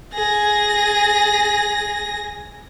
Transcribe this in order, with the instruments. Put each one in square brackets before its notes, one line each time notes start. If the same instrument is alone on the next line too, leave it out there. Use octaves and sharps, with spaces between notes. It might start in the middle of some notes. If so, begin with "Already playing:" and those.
[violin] G#4 A#6